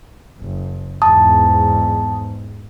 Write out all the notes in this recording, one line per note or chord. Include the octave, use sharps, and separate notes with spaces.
F#1
E2 G#2 A5 D#6